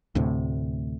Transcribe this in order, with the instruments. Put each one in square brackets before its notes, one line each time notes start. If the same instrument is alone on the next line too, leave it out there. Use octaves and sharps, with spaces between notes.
[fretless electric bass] D2 A2 C3